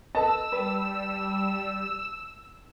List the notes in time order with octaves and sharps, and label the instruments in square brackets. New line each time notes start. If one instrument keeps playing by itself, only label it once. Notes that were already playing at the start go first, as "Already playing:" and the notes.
[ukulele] A4 B4 D#5 [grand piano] A5 [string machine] E6
[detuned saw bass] G3 [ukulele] B4